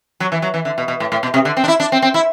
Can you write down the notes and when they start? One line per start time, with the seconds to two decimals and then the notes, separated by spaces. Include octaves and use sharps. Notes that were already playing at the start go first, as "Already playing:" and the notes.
0.20 F#3
0.32 E3
0.42 F#3
0.54 E3
0.65 D3
0.78 B2
0.88 B2
1.00 A2
1.12 A2
1.23 B2
1.34 C3
1.45 D3
1.57 C4
1.64 D4
1.68 E4
1.80 D4
1.92 C4
2.02 C4
2.14 E4